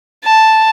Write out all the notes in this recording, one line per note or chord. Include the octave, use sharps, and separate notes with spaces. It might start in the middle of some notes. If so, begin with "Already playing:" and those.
A5